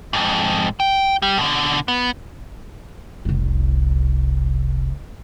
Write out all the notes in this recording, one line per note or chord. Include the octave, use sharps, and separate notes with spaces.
F2 G#2
G5
G3
B2 D3
B3
F1 C2